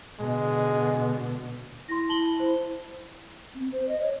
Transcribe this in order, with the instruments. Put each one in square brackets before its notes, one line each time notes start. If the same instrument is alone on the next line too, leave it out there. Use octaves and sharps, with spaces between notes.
[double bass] B2 D3 [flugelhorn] G#3
[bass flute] E4 [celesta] C6 A#6
[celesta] A5 F#7 G7
C5
[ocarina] C4
C5
D#5
C#5